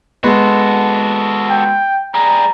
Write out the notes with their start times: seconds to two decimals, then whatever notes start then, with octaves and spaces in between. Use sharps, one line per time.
0.24 G#3 B3 F#4 A4
1.50 G5
2.15 G3 G#4 A#5